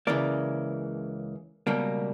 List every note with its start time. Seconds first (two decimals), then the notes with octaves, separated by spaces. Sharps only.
0.07 C#2 C#3 E3 A#3 D5
1.67 C#2 B2 G3 A#3